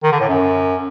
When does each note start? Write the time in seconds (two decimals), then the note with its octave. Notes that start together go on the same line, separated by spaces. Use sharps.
0.03 D#3
0.12 D3
0.20 A2
0.29 F#2